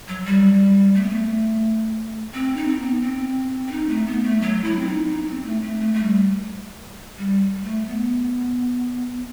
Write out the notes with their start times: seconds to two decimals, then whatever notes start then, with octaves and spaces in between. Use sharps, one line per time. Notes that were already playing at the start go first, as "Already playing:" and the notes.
0.08 F#3
0.26 G3
0.95 A3
1.03 B3
1.10 A3
2.34 C4
2.57 D#4
2.67 C4
2.79 B3
3.02 C4
3.67 C4
3.71 D#4
3.89 A3
4.07 B3
4.23 A3
4.41 F#3
4.64 E4
4.79 C4
4.87 D#4
5.10 D#4
5.22 B3
5.28 C4
5.45 A3
5.62 A3
5.80 A3
5.94 A3
6.03 G3
7.18 G3
7.56 G3
7.64 A3
7.88 B3